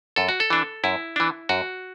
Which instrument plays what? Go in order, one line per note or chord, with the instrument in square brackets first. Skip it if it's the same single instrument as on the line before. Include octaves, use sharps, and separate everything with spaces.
[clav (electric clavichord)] F#2 A4
F#4
A4
E3 D4
F#2 E4
E3 D4
F#2 F#4